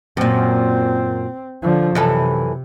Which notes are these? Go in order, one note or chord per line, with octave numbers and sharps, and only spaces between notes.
F#2 A#2 C4
D3 F3
F#2 C3 E3 A4